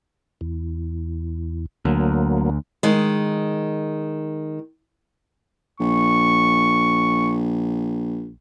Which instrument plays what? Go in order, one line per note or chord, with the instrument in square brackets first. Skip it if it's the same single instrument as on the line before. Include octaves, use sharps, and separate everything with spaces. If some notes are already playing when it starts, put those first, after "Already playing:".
[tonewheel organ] E2
[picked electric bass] D2 [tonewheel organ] F#3 A#3
[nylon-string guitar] D#3 G#3
[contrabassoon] A#1 [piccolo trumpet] C#6